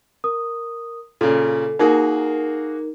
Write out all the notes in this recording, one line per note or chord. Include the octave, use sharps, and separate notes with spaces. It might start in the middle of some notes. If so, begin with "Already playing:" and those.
A#4 D#6
A#2 C#3 A4
A#3 D#4 F#4 G#4 A#4